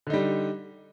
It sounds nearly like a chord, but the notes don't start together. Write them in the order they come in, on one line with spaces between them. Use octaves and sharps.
D3 D#4 G3